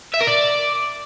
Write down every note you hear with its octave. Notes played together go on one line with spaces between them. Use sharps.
E5
A#4
D5